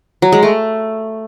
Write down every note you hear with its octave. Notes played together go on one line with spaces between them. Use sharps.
F#3
G#3
A3